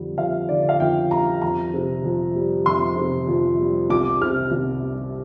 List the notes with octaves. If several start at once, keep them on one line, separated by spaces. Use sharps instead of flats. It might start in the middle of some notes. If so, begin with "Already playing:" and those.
Already playing: F2 D3 G3
F2 F5
D3 D5
F5
F2 G5
G3 A#5
F2 A#5
C3
F2
G3
F2 C6
C3
F2
G3
C2 D6
C3 F6
C2
G3